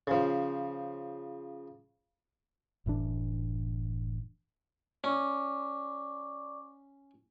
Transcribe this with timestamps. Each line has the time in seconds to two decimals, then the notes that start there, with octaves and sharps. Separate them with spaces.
0.07 C#3 F3
2.86 F#1 A2 E3 D4
5.04 C#4 D5 C#6 D6